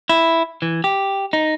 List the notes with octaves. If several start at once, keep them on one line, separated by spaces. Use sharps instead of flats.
E4
E3
G4
D#4